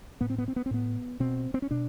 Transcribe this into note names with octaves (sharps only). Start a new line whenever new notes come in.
A2 B3
C4
B3
C4
B3
C4
A2 B3
B2 C4
C4
C#4
B2 D4